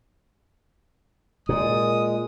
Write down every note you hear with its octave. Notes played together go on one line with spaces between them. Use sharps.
A#2 G#3 D#6